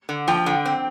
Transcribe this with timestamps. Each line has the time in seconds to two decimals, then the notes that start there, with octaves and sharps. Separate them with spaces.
0.09 D3
0.28 F3 G5
0.46 D3
0.66 C4